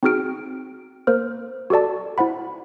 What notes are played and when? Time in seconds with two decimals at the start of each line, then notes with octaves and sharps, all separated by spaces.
0.03 C4 D#4 F#4 G#4 F6 D7
1.07 A#3 A#4 C5 F6
1.70 F#4 G4 A4 D5 A5
2.18 E4 C5 F#5 B5